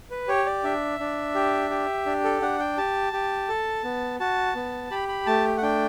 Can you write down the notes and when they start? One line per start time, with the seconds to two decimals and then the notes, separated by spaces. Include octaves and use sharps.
0.11 B4
0.28 G4 C#5
0.46 D5
0.64 D4 E5
1.00 D4
1.35 G4
1.70 G4
2.06 D4
2.24 A4
2.42 D4 F#5
2.59 G5
2.77 G4 A5
3.13 G4
3.49 A4
3.84 B3
4.20 F#4 A5
4.55 B3
4.91 G4 B5
5.08 B5
5.26 A3 A5
5.57 F#5
5.62 D4 G5